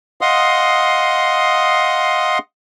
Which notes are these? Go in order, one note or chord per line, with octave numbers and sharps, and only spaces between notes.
D#5 F5 F#5 C6 D#6